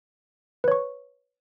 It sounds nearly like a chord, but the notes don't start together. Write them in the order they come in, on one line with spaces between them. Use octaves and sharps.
B4 C#5 C#6